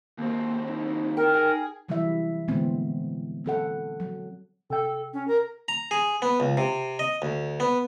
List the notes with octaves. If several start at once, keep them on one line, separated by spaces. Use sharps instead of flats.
D#2 A#3 C4
D#4 E4
E4 A#4 G5
G#4 G5
C3 E3 F#3 G3 E4 E5
A#2 D3 E3 G#3 B3 C4
F#3 C4 A4 F#5
F#3
C3 A4 G5
C#4
A#4
A#5
G#4
B3
C#2
C3
D#5
D2
B3